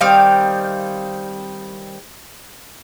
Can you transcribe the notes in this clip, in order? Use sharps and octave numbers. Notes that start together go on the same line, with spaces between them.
D#3 G3 C4 F5